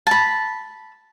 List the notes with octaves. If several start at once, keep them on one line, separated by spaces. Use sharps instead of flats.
A5 B5